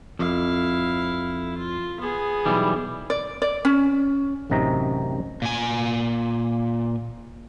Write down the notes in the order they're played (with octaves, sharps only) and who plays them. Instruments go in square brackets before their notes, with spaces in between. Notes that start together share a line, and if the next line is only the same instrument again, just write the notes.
[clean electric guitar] F2 [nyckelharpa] E4 F5
[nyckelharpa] F4
B3 G#4
[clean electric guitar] B1 E3 G3
[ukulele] D5
D5
C#4
[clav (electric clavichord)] A1 F#2 C3 D#4 A#5
[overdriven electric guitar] A#2 G#5